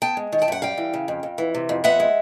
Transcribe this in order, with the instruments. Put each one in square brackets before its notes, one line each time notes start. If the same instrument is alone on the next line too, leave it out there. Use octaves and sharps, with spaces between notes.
[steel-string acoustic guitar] B3 G5 A5
G#3
D#3
G5 A5
F#2 F#5
G3 F5 G5
E3
C#3
F2
F2
E3
C3
F2
B3 E5 F#5
G#3